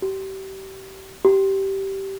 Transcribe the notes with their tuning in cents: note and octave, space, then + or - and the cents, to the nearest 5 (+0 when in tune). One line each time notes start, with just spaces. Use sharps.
G4 -30
G4 -15